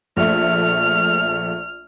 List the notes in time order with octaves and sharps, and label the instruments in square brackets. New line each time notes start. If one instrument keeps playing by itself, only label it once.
[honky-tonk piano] A#1 A3 [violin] F6